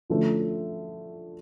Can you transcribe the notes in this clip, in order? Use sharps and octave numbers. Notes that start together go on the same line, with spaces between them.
D3 F3 A3 C#4